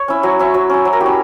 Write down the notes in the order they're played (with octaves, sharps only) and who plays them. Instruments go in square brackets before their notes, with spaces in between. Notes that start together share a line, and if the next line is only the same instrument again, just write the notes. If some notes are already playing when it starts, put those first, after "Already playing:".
Already playing: [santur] C#5
C#4 E4
F#3
C#4 E4
F#3
C#4 E4
F#3
A#4
E4 G4
C#4